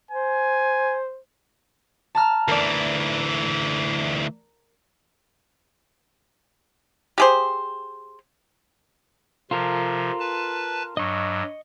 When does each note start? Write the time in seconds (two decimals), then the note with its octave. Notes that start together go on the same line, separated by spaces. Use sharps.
0.11 C5 G#5
2.15 A5 A#5 F6
2.48 D2 E3 A#4 D5
7.18 G4 G#4 C5
9.51 C3 F3 F4 A4 A#4
10.20 B4 A5
10.97 G2 F#3 D#5 C#6